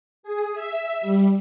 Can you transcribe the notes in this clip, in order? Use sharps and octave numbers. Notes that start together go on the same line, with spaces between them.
G#4
E5
G3